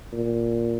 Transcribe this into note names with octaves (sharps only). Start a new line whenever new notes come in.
A#2